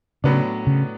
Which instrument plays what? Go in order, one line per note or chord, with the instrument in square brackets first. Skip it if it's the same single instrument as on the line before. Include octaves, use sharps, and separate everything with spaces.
[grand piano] A2 F#3 B3 D4 [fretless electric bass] C#3
[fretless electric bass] C#3